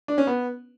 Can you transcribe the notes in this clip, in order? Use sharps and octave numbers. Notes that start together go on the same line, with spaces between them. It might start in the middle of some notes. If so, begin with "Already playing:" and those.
D4
C#4
B3